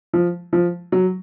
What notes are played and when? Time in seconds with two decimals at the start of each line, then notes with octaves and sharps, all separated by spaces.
0.13 F3
0.53 F3
0.92 F#3